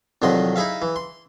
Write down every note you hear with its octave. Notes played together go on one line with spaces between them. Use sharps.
C2 F2 D#3 F#3 D#5 C6
D#4 E4 G#4 E5 F5
E3
C6